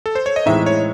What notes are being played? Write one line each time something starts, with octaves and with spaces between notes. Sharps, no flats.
A4
C5
C#5
D#5
A2 E3 G#3 C4 D#4 E5
C#5